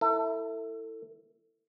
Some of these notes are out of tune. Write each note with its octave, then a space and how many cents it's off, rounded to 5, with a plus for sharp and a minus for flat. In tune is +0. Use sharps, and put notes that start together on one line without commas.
E4 +0 A4 +30